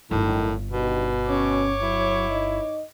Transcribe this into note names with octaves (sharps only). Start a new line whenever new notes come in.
G1 A2 D#3 F#3
G2 B2 D#3
C#4 C#5 D6
F#3 E4
D#4 D#5